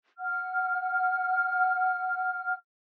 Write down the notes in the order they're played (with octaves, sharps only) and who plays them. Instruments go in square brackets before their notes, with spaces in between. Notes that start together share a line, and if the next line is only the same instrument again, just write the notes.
[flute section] F#5 F6